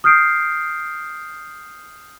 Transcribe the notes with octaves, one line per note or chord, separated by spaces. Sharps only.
D#6 F6 G6 C7 D7